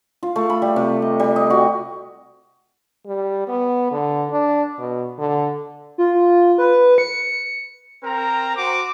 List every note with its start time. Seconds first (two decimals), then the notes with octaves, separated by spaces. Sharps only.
0.23 F4
0.36 A3
0.50 B5
0.62 G3
0.76 C3
1.02 D#5
1.20 G3
1.36 D#5
1.50 F#4
3.06 G3
3.48 B3
3.92 D3
4.30 D4
4.79 B2
5.19 D3
5.98 F4
6.58 B4
6.98 C#7
8.04 C4 A#4 G5 A#5
8.56 F#4 C5 D6